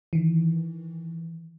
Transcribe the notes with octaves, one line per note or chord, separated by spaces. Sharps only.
D#3 E3